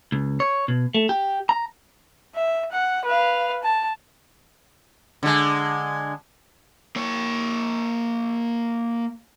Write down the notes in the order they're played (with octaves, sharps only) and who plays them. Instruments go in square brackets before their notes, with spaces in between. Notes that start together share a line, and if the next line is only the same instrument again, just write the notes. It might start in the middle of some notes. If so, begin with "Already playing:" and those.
[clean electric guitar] C#2
C#5
B2
A3
G4
A#5
[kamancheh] E5
F#5
B4 F5
A5
[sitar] D3 G#3
[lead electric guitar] A#3 C#5